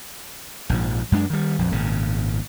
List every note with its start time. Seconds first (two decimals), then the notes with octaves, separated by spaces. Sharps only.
0.70 A#1 G#2 E3 F3
1.12 F#2 G#3 D4
1.30 D#3 G3
1.59 A#1 F2
1.72 G#1 A#2 C#3